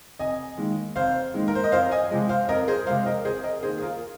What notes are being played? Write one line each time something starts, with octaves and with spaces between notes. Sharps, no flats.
F1 D#5 G#5
D#2 D#3 G#3
F1 C5 F5
D#2 D#3 G#3
A#4
C5
D#5
F2 C5 F5
D#5 G#5
C3 F3 G#3
C5 F5
F2 A#4 D#5
G#4 C5
C3 F3 G#3 C5 F5
A#4 D#5
F1 G#4 C5
A#4 D#5
D#2 D#3 G#4 C5
G#4
F4 A#4